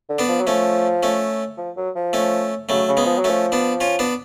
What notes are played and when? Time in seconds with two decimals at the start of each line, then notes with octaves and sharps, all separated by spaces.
0.09 D3
0.19 B3 D4
0.28 F3
0.41 F#3
0.47 F3 A3 C#4
1.03 A3 C#4
1.58 F3
1.77 F#3
1.95 F3
2.13 A3 C#4
2.69 C#3 F#3 A3
2.88 C#3
2.97 G#3 B3
3.06 F3
3.18 F#3
3.24 A3 C#4
3.30 F3
3.52 B3 D4
3.81 C#4 F4
3.99 B3 D4